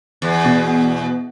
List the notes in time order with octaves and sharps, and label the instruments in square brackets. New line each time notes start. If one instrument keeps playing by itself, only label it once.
[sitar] E2
[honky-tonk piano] B2